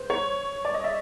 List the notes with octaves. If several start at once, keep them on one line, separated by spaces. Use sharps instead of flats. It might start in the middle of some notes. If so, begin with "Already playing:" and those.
Already playing: B4 C5
C#5
D5
D#5
E5